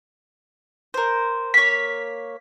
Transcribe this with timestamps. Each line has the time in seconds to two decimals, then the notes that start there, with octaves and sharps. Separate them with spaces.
0.94 A#4 C5
1.54 A#3 C#5 B6